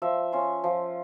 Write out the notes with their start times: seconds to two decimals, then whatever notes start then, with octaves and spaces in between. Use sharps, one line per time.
0.02 F3 E5
0.32 C#4 F4
0.64 F3